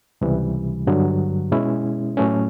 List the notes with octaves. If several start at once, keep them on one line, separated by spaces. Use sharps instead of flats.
C#2 C3 E3 G3
G2 D3 F#3
B2 G#3 C#4 E4
A2 F#3 A3 C#4